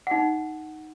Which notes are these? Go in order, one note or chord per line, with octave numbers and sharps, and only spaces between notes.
D#4 F#5